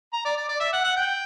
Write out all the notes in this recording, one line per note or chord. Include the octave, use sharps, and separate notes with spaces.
A#5
D5
D5
D5
E5
F#5
F#5
G5